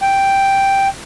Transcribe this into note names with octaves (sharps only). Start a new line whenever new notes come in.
G5